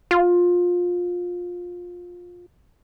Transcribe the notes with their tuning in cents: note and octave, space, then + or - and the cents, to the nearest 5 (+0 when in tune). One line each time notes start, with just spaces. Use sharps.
F4 +20